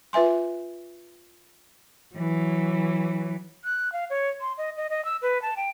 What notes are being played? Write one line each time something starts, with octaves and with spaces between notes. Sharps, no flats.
F4 B4 E5 G#5 C6
E3 F#3
F#6
F5
C#5
C6
D#5
D#5
D#5
E6
B4
A5
G5